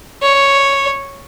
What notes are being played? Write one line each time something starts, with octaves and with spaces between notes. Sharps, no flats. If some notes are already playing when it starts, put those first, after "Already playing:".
C#5